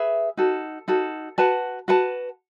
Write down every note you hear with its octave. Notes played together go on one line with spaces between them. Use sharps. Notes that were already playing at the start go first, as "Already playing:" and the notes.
Already playing: G#4 B4 E5
D#4 F#4 A4
D#4 F#4 A4
F#4 B4 F#5 A5
F#4 B4 F#5 A5